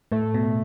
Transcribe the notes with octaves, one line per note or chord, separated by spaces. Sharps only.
A2 A3
B2